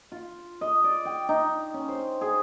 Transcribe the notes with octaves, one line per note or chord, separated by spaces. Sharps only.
F4
D#5
D5
G5
D#4
C#4
C5
G#4